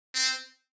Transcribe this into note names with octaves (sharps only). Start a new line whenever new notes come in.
C4